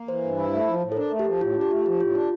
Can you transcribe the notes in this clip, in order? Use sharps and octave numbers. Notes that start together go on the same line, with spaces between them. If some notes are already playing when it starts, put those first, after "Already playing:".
Already playing: A#3
E3 C5
G2
E4
A3
F3
A2
A4
D4 A#4
A3
G4
F3
A2 F4
D4
G4
A3 F4
F3 G4
A2 F4
D4 F4